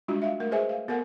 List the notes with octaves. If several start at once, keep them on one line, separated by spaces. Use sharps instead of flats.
G3 G#3 D4 F4 F#4 D#5
E5 F5
A3 A#4
G#4 B4 C5 D#5 E5 G#5
F5
B3 A4 A#4 F#5